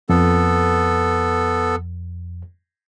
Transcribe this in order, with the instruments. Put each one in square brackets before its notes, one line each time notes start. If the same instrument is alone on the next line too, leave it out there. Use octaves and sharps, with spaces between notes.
[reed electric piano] F2 [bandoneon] B3 A4